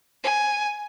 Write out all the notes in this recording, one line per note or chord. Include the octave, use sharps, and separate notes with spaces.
G#5